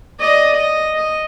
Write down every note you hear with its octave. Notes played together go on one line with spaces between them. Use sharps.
D5 D#5
D#5
D#5